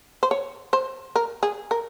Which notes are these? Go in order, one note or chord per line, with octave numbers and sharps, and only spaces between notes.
C5
C#5
C5
A#4
G#4
A#4